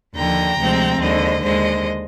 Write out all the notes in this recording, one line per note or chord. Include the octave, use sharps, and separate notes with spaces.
D#2 D3 F3 G5 A#5
D2 C3 F3 G#3 C4
D#2 D3 G#3 C5 D#5
D#2 D3 G#3 C5 D#5